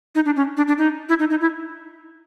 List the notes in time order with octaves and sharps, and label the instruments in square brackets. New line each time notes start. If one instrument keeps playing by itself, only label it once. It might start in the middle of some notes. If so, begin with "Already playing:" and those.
[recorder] D#4
D4
C#4
D4
D4
D#4
E4
D#4
D#4
E4